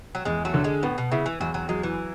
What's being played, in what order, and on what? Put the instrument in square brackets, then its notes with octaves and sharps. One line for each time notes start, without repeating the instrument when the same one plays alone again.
[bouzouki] F#3
[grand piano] E2 [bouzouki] G#3
[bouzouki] F#3 A3
[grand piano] D3
[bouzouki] G#3
[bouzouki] A2 [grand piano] B3
[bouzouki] B2
[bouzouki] C#3 [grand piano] E4
[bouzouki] E3
[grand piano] E2 [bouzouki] F#3
[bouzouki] F#3
[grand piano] F#3 [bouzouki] G#3
[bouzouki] E3